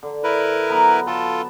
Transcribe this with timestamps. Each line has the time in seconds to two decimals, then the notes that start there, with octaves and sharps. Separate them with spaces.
0.03 D3
0.24 E4 A#4 B4
0.70 F#3 B3 A#5
1.07 F4 A4 A5